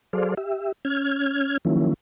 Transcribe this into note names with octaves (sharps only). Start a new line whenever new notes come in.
F#3 G#4 A4 C5 D5 F5
G4 E5
C#4 F6 G#6
D#3 F3 F#3 A#3 C#4 E4